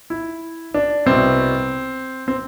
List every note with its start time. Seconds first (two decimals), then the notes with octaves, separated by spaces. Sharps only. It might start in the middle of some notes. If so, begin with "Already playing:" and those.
0.10 E4
0.74 D4
1.06 C2 B2 C4
2.28 C4